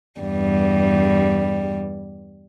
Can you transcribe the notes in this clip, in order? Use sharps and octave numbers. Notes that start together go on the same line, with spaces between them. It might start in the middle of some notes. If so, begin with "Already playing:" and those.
E2 G2 G3